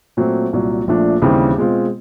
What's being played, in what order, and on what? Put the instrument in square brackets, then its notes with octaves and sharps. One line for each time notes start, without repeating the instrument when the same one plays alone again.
[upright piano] A#2 F#3 A3 C4
C2 A#2 F#3
A#1 A#2 F3 A3 D4
D#2 C#3 E3 G3 C4
B2 G#3 C4 F4